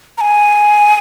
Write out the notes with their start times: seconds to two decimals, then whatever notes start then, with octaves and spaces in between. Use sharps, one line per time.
0.18 A#5
0.21 G#5